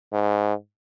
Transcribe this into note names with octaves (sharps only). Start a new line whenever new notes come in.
G#2